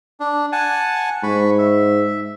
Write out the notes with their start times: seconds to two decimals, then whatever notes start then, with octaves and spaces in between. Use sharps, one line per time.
0.20 D4
0.52 F#5 G#5 A5
1.23 G#2 B5 C#6
1.58 E5